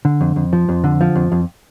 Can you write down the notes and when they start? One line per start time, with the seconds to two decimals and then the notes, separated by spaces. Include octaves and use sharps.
0.05 D3
0.21 F2
0.36 F2
0.53 F3
0.69 F2
0.84 D3
1.01 F3
1.15 F2
1.32 F2